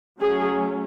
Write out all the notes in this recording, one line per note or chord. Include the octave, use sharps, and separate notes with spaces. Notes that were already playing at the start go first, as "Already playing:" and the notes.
F#3 A3 C#4 G#4